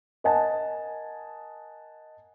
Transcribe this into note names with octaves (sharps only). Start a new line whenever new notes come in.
A#4 D#5 F#5 G#5 A5